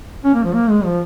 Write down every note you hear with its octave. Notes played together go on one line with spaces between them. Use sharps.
C#4
A#3
F3
A#3
G#3
F3